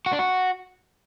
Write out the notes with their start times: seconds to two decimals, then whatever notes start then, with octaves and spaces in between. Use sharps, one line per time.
0.06 F#4
0.13 D4
0.19 F#4